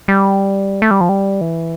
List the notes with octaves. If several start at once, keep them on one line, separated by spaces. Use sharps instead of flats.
G3
A3
G3
F3
G3
E3